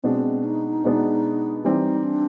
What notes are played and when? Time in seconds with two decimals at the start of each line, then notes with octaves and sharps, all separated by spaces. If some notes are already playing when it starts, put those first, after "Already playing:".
0.04 B2 G#3 B3 C4 D4
0.44 D#4
0.84 B2 G#3 B3 D4
1.64 E3 G3 C4 D#4
2.04 D4